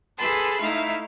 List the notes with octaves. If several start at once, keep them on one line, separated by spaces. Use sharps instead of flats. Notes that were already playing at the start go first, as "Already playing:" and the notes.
G#4 A4 B4 A5 B5 C6
A3 D#4 E4 F5